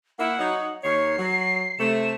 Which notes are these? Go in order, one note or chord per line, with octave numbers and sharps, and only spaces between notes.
A#3 E4 F#5
F#3 D#4
D#2 D#3 C#5 C7
F#3
C3 A3 E7